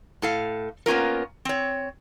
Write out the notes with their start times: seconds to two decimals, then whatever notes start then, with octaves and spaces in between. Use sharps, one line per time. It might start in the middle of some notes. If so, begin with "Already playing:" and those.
0.22 A2 A4 F5
0.86 A#3 B3 C#4 F4 A#4
1.45 C4 C#5